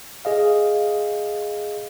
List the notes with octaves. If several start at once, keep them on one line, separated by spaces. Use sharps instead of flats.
G#4 D#5 F5